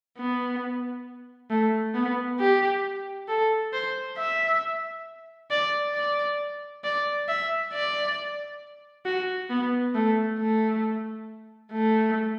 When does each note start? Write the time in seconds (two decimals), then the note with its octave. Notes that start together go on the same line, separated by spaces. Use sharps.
0.18 B3
1.50 A3
1.95 B3
2.40 G4
3.28 A4
3.73 C5
4.18 E5
5.51 D5
5.95 D5
6.84 D5
7.28 E5
7.72 D5
9.06 F#4
9.50 B3
9.95 A3
10.39 A3
11.72 A3